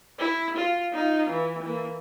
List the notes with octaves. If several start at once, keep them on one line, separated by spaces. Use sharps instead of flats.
E4
F4
D#4 F4
E3
E3 A#3